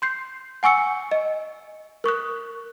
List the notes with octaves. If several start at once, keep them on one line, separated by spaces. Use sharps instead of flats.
C6 G6 C7
F#5 G#5 C#6 E6 C#7
D#5
A#4 C#6 D#6 F#6